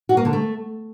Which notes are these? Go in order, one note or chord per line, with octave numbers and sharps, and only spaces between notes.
F#4
A#3
D3
A3